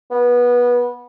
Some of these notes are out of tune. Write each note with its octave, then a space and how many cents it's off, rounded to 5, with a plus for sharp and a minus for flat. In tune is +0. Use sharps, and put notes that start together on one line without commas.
B3 -20